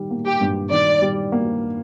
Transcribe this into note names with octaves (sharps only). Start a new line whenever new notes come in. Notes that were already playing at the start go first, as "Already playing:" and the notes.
Already playing: D#3 G3
A#3
G4
G2
D#3 D5
G3
A#3